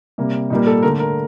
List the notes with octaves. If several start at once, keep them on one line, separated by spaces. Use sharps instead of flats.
C3 G3 A#3
A#2 G3 A#3 D#4
A4
D3 A3 A#4
A#4